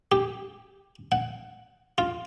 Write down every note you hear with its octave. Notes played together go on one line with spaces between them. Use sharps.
G4
F#5
F4